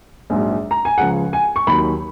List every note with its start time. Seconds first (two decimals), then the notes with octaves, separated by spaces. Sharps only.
0.30 A#1 G#2 F#3
0.71 A#5
0.85 G#5
0.98 C#2 C#3 F3 F#5
1.33 G#5
1.56 C#6
1.67 D#2 D#3 F#3 B5